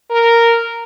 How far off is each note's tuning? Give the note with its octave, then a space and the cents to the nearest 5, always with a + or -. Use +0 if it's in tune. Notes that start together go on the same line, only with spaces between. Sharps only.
A#4 -5